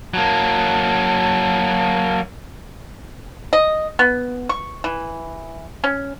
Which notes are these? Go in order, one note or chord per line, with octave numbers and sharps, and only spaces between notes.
F#3 A#3 A5
D#5
B3
C#6
E3
C#4